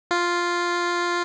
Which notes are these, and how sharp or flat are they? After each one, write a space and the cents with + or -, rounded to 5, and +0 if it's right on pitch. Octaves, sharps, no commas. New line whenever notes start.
F4 +0